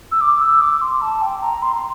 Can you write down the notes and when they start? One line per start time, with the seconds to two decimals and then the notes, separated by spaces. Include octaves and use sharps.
0.12 E6
0.21 D6
0.41 E6
0.61 D6
0.82 C6
1.02 A5
1.22 G5
1.42 A#5
1.62 C6
1.76 C6